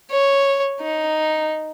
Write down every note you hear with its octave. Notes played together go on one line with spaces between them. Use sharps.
C#5
D#4